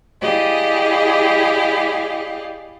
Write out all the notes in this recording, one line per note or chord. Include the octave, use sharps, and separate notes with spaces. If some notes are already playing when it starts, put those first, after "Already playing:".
E4 G4 G#4 D5 D#5 F5